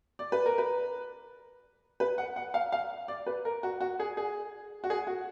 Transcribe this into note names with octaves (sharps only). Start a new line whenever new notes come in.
D5
B4
A#4
B4
B4
F#5
F#5
F5
F5
D5
B4
A#4
F#4
F#4
G#4
G#4
F#4
G#4
F#4